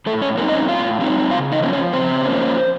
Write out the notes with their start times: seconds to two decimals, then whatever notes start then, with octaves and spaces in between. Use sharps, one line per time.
0.06 A2 A3 A4
0.21 C#4 C#5
0.37 F#3 A#3 C4 D#4 A#4
0.49 D#5
0.53 C#4 C#5
0.68 A2 F4 F5
1.00 F#3 C4 D#4
1.31 C#3 F4 F5
1.52 D#4 D#5
1.62 F3 A#3 C#4
1.73 C#4 C#5
1.93 C#3 C4 C5
2.25 F3 A#3 C#4